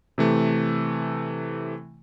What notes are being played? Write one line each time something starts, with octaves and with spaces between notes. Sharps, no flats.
C3 E3 A3